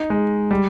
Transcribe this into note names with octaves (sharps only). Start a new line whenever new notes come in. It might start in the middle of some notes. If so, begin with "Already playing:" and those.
Already playing: D#4
G#3
G3